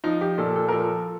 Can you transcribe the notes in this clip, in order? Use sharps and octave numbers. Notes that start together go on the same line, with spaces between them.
F3 D#4
G4
A#2 A4
A4
A#4
F3 A4